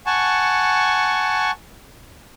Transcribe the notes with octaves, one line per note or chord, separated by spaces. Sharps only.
F#5 G#5 A5 C#6